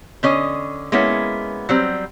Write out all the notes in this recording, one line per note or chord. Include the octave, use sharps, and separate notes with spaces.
D3 C#4 D#5
G#3 A#3 B3 C#4 E4
F#3 G3 C4